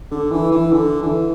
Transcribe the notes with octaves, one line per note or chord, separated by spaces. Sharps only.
D3
E3
E3
D3
E3